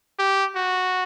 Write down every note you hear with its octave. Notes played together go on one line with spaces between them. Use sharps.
G4
F#4